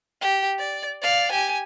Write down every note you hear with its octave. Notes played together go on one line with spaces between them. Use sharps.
G4
D5
D5 F5
G4 G#5